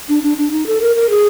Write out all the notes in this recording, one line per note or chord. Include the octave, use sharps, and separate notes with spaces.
D4
D4
D4
D#4
A4
A#4
A#4
G#4